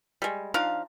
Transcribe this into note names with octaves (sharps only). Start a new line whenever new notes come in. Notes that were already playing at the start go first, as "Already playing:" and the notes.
G3 G#3
F3 D4 D#4 F5